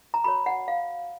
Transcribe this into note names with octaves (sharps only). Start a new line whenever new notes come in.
A#5
F#4 A#4 C#5 B5
F#5
F5